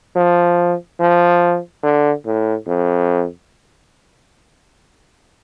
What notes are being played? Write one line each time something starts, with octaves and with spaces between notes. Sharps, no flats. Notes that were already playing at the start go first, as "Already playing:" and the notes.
F3
F3
D3
A2
F2